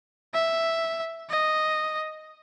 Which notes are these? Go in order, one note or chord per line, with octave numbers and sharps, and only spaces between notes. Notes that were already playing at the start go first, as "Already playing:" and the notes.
E5
D#5